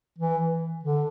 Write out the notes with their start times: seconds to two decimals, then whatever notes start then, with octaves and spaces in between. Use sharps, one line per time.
0.19 E3
0.83 D3